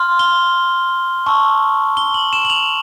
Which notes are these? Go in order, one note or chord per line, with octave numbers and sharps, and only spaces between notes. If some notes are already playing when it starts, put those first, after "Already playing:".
Already playing: C6 F6
G7
A5 C#6 E6
G7
F#7
E7
F#7
F7